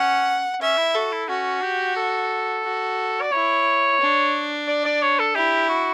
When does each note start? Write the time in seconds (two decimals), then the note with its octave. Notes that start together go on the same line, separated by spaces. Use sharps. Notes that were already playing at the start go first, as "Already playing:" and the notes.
Already playing: C#4 F#5
0.61 C#4 E5
0.77 E4
0.95 F#4 A4
1.12 E4
1.29 C#4 F#4
1.62 G4
1.96 A4
2.64 F#4
3.21 D5
3.32 E4 C#5
4.00 D4
4.68 D5
4.85 D5
5.02 C#5
5.19 A4
5.35 E4 G4
5.69 F#4